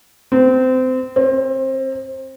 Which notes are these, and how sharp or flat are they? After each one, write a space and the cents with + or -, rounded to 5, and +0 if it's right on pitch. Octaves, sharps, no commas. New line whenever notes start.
C4 -25
C4 +25